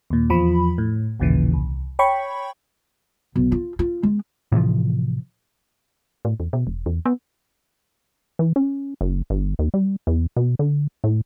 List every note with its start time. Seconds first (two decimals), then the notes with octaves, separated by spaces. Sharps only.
0.10 D#2 A#2
0.30 E2 F3 B5
0.78 A2
1.20 A1 D#2 A#2 C#3 E3
1.53 C2
1.99 C#5 G5 B5 C#6
3.36 B1
3.52 F4
3.79 F4
4.03 G#3
4.52 A2 C3 E3 F3
6.25 A2
6.40 E2
6.53 B2
6.67 E1
6.86 E2
7.06 B3
8.39 E3
8.56 C#4
9.01 F#1
9.30 G1
9.59 D#2
9.74 G3
10.07 E2
10.36 B2
10.59 D3
11.04 A2